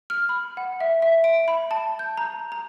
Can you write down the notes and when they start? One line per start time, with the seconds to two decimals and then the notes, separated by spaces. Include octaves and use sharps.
0.10 F6
0.29 B5
0.57 F#5
0.80 E5
1.02 E5
1.24 D7
1.48 B5
1.71 A5
1.99 G6
2.17 A#5
2.52 A#5